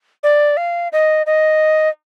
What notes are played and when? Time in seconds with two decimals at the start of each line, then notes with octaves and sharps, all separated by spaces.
0.23 D5
0.57 F5
0.93 D#5
1.26 D#5